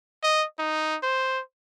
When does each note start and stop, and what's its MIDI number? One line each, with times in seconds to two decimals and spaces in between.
0.23 0.45 75
0.59 0.97 63
1.03 1.41 72